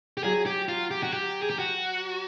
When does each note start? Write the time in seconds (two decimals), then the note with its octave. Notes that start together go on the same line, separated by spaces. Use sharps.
0.17 G4
0.23 F#3 G#4
0.46 G4
0.69 F4
0.91 G4
1.03 F#4
1.13 G4
1.42 G#4
1.50 G4
1.59 F#4